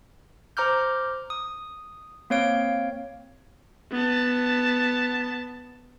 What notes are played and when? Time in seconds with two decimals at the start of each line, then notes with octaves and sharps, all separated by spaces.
0.57 C5 A#5 D6 F6 G6
1.30 D#6
2.30 A#3 C4 C#5 F5 D7
3.91 B3 A5